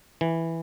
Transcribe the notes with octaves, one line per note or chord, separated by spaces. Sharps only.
E3